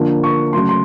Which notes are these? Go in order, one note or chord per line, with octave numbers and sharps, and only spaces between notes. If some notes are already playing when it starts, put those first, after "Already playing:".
Already playing: D3 F3 A#3
C#6
C#3 F#3 A3 C6
C6